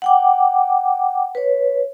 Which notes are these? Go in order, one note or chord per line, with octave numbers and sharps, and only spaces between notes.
F#5 G5 D6
B4 C#5